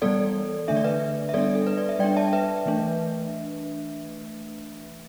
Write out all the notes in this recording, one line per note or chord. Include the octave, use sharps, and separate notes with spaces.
E3 G3 B3 A4 D5
D3 A3 D4 E5
D5
B4 E5
E5
G3 B3 D4 A4 D5
A4
B4
D5
E5
G3 D4 D5 G5
E5 A5
B4 E5
E3 A3 D4